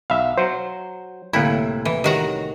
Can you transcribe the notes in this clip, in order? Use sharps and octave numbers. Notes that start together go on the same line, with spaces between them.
B1 E5 F5 B5
F#3 C5
C2 A2 D3 A#3 E4 F5
E3
D#3 F#4 G4 C#5 A#5